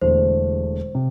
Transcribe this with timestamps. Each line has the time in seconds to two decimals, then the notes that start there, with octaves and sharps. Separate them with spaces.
0.01 E1 E2 D3 A3 C5
0.95 C3